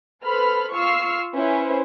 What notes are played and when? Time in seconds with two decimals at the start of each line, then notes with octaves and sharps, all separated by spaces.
0.25 A4 B4 C5 B5 F6
0.74 F4 C#6 E6 F6 C7
1.35 C#4 E4 B4 C5